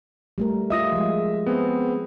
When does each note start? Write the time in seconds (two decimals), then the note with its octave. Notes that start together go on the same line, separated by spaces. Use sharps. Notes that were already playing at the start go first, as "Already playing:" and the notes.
0.38 G3 A3 A#4
0.70 F4 G4 D#5 E5 D#6 A#6
0.92 F3 G#3
1.46 B3 C4 G#4